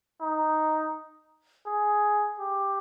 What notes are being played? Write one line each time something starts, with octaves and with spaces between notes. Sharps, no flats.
D#4
G#4
G4